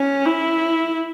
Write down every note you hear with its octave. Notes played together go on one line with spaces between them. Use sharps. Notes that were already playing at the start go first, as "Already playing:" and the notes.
Already playing: C#4
E4